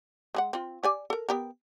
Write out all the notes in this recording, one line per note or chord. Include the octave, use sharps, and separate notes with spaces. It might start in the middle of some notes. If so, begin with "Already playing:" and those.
G#3 G#4 F#5
C4 F4
G4 D5 G#5
A4 A#4
B3 G4 A#4